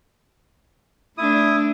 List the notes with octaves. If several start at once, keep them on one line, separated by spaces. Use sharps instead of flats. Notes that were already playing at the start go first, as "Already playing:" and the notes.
A3 D4 E4 D#6